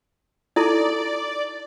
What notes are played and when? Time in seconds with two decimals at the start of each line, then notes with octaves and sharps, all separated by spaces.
0.56 D#4 E4 A4 D5